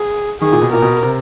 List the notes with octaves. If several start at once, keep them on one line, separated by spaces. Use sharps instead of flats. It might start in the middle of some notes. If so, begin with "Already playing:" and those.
Already playing: G#4
D#3 G#4
A#2
B2
A#2 A#4
B2
C3